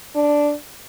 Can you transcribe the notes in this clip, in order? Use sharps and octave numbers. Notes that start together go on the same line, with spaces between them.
D4